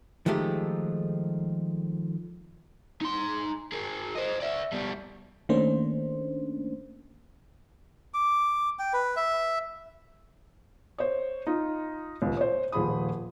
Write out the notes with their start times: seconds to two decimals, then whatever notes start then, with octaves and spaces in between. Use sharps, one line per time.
0.26 D#3 F3 G#3 A3 G4
3.01 D#4 C6
3.72 G#4 A#4
4.16 C5 D#5
4.41 D5 E5
4.72 B2 G3
5.49 D#3 A3 A#3 C#4 D4 C5
8.14 D6
8.79 G5
8.93 B4
9.16 E5
10.98 C5 C#5
11.47 D#4 F4
12.22 D#1 C#2
12.37 C5 C#5
12.72 D#1 F3 G#4 B5 D#6